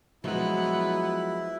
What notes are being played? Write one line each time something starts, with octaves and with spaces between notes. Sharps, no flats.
F3 F#3 G#3 B3 E4